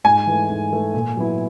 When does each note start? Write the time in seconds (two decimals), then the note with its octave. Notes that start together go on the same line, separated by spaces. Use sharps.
0.04 G#2 G#5
0.27 E3 A3
0.50 G#2
0.72 E3 A3
0.94 A#2
1.17 F#3 B3 E4